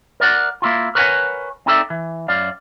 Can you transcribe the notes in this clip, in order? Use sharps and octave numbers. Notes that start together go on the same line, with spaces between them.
A#4 D5 F#5
A#3 E4 F4
A#4 B4 C#5 D#5 F#5 G#5
C4 D#4 E4 A4 D5 E5
E3
F#2 D5 F5